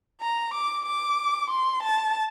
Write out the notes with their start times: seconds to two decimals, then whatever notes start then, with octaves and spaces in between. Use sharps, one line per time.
0.21 A#5
0.54 D6
0.85 D6
1.50 C6
1.82 A5